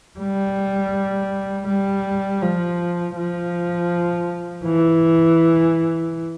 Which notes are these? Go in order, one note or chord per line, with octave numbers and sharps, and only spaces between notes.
G3
G3
F3
F3
E3